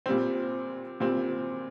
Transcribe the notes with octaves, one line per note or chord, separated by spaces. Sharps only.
A#2 G3 C4
A#2 G3 C4